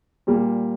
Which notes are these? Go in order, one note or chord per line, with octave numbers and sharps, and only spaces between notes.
A#2 G3 A#3